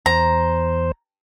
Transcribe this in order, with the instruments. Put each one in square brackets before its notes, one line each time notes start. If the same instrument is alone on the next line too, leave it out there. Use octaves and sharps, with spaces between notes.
[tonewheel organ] E2 C5 [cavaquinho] A#5